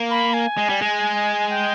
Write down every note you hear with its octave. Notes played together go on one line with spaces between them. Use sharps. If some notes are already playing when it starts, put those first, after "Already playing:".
Already playing: A#3
B5
G#5
G#3
G3
G#3
G5